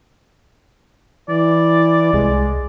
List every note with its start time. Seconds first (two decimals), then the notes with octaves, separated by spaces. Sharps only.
1.29 E3 D5
2.13 C2 G#3